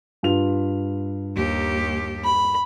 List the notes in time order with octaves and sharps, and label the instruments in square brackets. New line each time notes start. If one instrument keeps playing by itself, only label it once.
[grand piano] G2 F4 F7
[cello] D#2 G4
[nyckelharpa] B5